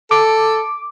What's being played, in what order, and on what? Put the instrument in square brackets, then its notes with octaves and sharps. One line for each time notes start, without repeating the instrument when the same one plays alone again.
[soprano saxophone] A4 [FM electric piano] D6